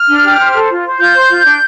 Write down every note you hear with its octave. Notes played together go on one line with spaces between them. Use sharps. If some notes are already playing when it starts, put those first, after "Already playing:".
Already playing: F6
D4
G4
C5
A4
F4
C5
F4 G6
C5
F4
D4